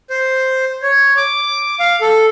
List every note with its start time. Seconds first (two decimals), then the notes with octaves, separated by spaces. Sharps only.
0.10 C5
0.82 C#5
1.17 D6
1.80 F5
2.01 A4